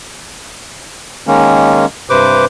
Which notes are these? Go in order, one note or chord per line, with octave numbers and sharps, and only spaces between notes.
D#3 G#3 A#3 C#4
G2 C3 B4 C5 D6